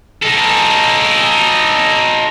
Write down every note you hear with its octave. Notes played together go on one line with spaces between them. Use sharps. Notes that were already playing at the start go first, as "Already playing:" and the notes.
D#4 A4